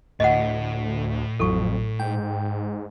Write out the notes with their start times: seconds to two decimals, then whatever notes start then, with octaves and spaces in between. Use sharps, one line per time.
0.20 D2 A2 D#5 F#5
1.40 A1 F2 F#3 A4 C#6
2.00 G#2 G5